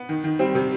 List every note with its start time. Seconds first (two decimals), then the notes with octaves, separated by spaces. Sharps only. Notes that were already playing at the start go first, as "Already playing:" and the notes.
Already playing: B3
0.09 D#3
0.24 D#3
0.39 G3 C4
0.55 C3